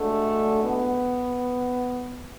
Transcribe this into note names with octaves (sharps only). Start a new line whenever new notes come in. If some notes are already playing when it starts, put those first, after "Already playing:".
Already playing: D2 D3 G#3 A3
B3